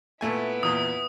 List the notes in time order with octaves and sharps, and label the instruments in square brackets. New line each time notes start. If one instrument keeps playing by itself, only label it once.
[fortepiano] A#2 A3 G#5 [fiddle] B3 E4
[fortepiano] E2 A#2 [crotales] D#6